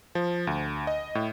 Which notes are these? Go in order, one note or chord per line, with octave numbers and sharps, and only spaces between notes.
F3
D2
D#5
A2